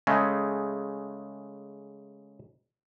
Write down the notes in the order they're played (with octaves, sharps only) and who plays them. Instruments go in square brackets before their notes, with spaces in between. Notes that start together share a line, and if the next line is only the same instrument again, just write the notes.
[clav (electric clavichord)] C#3 G#3 A3